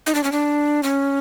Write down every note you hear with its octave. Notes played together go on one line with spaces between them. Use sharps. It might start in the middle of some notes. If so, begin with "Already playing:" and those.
D#4
D4
C#4
D4
C#4